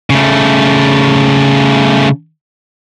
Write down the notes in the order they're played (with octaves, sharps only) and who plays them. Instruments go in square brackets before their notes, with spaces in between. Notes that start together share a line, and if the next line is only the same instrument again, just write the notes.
[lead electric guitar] C#3 A3